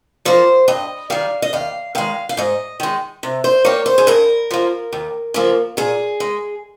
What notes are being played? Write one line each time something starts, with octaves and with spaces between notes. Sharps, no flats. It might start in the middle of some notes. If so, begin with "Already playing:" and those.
F3 A#3 C5
G2 D#5
D#3 G3 F5
D#5
D#2 F5
D#3 G#3 F5
F5
G#2 D#5
D#3 G#3
C3
C5
G3 A#3 C#5
C5
G#4
G2 A#4
F3 A#3
D#2
C#3 F3 A#3
A#2 G#4
G#3